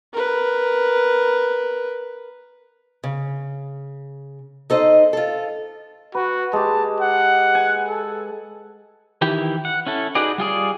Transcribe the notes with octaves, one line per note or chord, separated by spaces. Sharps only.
A#4 B4
C#3
D#4 A4 C5 D#5
F4 A4
F#4 B4
G#3 G4 A5
F#5
G#5
A4
D#3 E3 E4 G4
F#5
C#4 E4 A4
D#4 F#4 G#4 B4 D5
G3 F4 G#4 D5